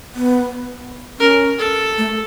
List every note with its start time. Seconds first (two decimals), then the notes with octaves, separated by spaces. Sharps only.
0.15 B3
1.19 C#4 A#4
1.59 A4
1.98 A3